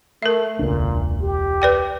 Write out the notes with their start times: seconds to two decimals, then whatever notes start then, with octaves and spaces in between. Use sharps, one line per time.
0.22 A3 A#4 E5
0.59 E1 C#2 A#2 D4
1.21 G4
1.62 B4 D5 G5